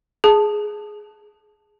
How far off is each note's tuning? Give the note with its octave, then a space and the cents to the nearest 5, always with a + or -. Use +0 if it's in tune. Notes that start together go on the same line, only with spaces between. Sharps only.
G#4 +10 A5 +0